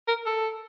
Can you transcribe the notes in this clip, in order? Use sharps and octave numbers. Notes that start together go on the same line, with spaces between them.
A#4
A4